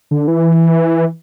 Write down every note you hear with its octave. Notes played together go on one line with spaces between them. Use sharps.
D3
E3